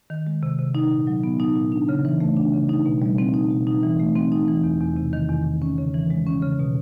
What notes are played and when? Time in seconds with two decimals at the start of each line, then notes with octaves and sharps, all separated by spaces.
0.10 D#3
0.27 G#3
0.43 C3
0.59 C3
0.75 D#4
0.91 A#2
1.07 F#3
1.24 B3
1.40 D#4
1.56 A#2
1.72 D4
1.89 C#3
2.05 E3
2.20 A3
2.36 D4
2.53 C#3
2.69 D#4
2.86 B2
3.02 G3
3.18 C4
3.34 D#4
3.50 B2
3.67 D#4
3.83 E3
4.00 A3
4.16 C4
4.32 D#4
4.48 E3
4.64 E2
4.80 E2
4.97 C3
5.13 D#3
5.29 E2
5.45 E2
5.62 C#4
5.78 C#3
5.94 E3
6.10 G#3
6.27 C#4
6.42 C#3
6.59 B2